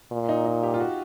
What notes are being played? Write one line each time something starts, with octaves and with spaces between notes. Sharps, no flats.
A#2
D#4
D#4
G4
F4
F#4